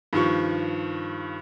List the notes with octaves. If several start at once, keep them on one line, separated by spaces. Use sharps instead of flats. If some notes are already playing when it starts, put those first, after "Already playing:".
G2 D#3 F3 C#6